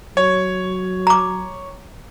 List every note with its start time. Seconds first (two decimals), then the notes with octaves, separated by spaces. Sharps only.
0.17 F#3 C#5
1.07 A#5 D6